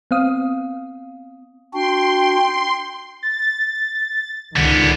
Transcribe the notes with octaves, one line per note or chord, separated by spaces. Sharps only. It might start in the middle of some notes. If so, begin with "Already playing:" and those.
B3 C4 F5 D#6
D4 F#4 G5 C6
A6
C#2 D3 D#3 B3